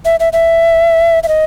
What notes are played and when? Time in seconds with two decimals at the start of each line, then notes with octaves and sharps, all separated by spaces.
0.05 E5
0.20 E5
0.33 E5
1.23 E5
1.28 D#5